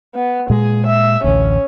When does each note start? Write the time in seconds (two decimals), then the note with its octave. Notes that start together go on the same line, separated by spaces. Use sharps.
0.15 B3
0.50 A#2 G#3 G#4
0.87 E5
1.24 A1 D2 C#4